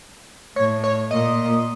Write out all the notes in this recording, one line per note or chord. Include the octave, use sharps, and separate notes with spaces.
A2 C#5
C#5
A#2 D#5